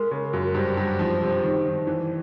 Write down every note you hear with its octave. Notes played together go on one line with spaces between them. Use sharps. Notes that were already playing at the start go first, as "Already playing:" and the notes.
Already playing: G#3 A#4
C#3
F#2
G2 C5
G2
F3
C3
D#3
D#3
E3